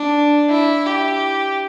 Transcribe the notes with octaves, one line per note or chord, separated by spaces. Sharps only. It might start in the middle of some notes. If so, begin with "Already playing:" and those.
Already playing: D4
E4
G4